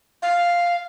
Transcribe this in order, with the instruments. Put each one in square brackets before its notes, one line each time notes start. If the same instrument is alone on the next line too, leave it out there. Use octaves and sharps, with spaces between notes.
[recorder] F5